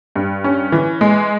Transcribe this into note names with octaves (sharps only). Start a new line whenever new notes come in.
G2
C#4
E3
G#3